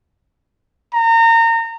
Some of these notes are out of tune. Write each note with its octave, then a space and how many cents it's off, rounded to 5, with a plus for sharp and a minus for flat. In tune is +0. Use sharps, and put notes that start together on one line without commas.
A#5 -30